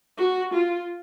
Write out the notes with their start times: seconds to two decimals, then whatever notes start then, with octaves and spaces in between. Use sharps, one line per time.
0.18 F#4
0.54 F4